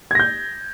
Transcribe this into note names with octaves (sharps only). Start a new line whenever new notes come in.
G6 G#6 A#6